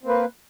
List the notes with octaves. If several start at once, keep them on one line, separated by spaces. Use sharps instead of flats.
A#3 C4 B4